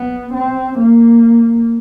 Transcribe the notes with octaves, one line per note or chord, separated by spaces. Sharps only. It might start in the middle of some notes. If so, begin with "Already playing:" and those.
Already playing: B3
C4
A#3